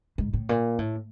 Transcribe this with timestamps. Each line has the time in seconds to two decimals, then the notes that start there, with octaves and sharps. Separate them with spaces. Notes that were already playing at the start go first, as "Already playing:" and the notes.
0.18 G#2
0.34 A2
0.49 A#2
0.79 A2